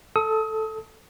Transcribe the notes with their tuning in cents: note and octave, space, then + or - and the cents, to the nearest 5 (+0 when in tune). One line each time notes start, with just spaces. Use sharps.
A4 +0 D#6 +30